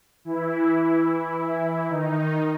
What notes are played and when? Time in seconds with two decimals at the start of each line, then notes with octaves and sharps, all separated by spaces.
0.25 E3 E4
1.90 D#3 D#4